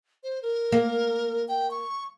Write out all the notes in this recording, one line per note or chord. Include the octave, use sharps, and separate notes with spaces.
C5
A#4
A#3
G5
C#6